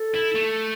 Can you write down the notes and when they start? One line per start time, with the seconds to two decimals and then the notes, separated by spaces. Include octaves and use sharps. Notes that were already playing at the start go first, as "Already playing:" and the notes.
Already playing: A4
0.15 E4
0.36 A3